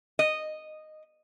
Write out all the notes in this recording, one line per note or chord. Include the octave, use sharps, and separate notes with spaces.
D#5